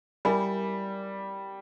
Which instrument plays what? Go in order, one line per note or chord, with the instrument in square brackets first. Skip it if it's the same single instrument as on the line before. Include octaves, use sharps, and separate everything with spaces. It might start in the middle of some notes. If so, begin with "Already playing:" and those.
[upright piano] G3 [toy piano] E4 A#4 E5 G#5 B5